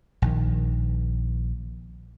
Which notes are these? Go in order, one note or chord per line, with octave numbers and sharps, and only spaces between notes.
A#1 D#3